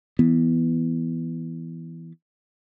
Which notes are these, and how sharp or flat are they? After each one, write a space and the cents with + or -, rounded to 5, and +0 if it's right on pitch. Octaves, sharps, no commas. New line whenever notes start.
E3 +0 B3 +0